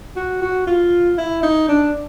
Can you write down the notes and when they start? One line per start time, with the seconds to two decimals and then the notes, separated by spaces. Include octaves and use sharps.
0.16 F#4
0.42 F#4
0.67 F4
1.18 E4
1.43 D#4
1.68 D4